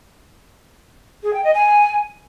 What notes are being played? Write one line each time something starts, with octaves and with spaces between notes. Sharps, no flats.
G#4
G5
D#5
G#5